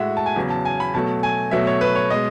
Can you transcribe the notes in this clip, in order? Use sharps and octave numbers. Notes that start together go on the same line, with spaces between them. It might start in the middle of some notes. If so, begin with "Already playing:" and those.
Already playing: A2 G#3 F#4 E5
A5
G#5
E2 C#3 F#3
A5
G#5
B5
B2 F#3 A3 A5
G#5
B2 F#3 A3 E5
C#5
B4
C#5
B2 G#3 D#5